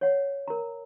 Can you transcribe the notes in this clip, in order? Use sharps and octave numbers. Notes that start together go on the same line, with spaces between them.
C#5 F#5
A#4 A#5